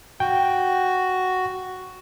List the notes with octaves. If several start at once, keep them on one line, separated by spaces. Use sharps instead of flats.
F#4 G5